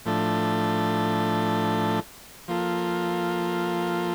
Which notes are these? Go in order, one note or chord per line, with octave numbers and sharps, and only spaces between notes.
A2 F3 A3 D4 A4
F3 A#3 F4 A4